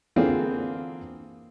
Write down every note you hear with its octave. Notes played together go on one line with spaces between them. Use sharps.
D3 E3 A#3 C4 F4 G#4